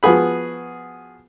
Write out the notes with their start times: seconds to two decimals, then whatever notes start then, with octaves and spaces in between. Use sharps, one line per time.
0.03 F3 B3 F#4 G#4 B5